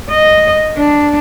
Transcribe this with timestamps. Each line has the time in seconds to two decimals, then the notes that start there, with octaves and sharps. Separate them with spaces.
0.11 D#5
0.78 D4